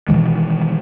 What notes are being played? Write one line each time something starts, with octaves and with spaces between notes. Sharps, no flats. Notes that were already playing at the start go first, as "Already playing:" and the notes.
B2 D#3 E3 G#3